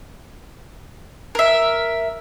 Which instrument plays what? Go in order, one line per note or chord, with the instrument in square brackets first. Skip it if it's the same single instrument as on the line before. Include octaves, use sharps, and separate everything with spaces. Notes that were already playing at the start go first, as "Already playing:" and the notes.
[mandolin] A#4 E5